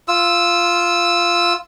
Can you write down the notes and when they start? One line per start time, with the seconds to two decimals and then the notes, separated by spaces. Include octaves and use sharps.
0.08 F4 E6